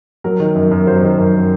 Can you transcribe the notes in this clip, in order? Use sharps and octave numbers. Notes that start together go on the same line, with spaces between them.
F#3 A#4
D#3
F#2
F#2
F#3 C5
D#3
F#2